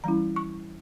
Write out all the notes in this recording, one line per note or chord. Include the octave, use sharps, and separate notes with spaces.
E3 G3 C#4 E4 A#5
C#6